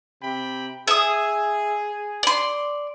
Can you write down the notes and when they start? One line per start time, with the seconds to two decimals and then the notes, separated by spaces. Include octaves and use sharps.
0.21 C3 G5 B5
0.88 G#4 E5 D#6
2.23 D5 C6